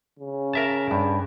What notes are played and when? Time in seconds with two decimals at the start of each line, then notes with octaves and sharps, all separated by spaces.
0.19 C#3
0.53 A#4 E5 A5
0.91 G2